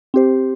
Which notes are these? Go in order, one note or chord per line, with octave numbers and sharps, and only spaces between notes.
C4 G4 C5